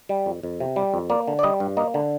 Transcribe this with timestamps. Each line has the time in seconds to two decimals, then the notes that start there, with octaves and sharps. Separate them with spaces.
0.09 G3
0.26 F2
0.43 F2
0.60 C3
0.76 G3
0.94 F2
1.10 A#3 D5
1.28 D3
1.39 D5
1.43 G3 D#5
1.60 G2
1.77 A#3 D#5
1.94 D3